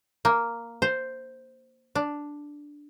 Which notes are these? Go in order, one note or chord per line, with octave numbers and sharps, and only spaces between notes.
A#3
C5
D4